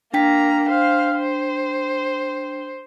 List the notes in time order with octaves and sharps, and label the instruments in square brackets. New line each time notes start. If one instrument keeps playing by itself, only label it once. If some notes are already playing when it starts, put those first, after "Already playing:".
[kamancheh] A#3 A#5 [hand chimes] D4 G5 B6
[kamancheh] C5 F5
C5